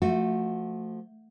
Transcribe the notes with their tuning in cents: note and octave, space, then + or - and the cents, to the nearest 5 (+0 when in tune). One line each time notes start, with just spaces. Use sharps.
F3 +0 A3 +15 F#4 -15